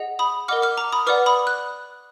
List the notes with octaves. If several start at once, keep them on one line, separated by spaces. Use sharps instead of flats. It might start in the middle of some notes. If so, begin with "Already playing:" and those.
Already playing: G#4 D#5 F#5
B5 D#6
A#4 D#5 F#5 D6 F6
D6 F6
A#5 D6
B5 D#6
B4 D5 F#5 D6 F6
B5 D#6
F#6